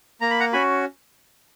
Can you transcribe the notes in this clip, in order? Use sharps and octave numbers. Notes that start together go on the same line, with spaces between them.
A#3 A#5
B5
F#5 A#5
C#4 F#4 G#5 B5